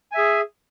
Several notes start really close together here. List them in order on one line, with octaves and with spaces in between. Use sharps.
G#5 E5 G#4